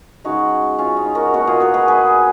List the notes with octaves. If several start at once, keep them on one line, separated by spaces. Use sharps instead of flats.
C#3 G#3 D#4 F#4
C#4 F4
D#4
F#4 A#4
B2 A#3 F#4 A#4
F4 G#4
F#4 A#4
G#4 B4
G#4 B4